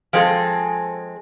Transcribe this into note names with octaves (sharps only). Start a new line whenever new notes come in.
F3 G#3 C4 G#4 A4